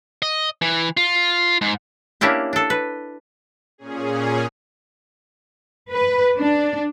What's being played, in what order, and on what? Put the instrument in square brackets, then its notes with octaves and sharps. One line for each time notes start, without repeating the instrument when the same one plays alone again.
[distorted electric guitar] D#5
E3
F4
G#2
[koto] A#3 C#4 D4 E4 G4
D4 A4
B4
[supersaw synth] A#2 C#4 G#4
[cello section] B4
D4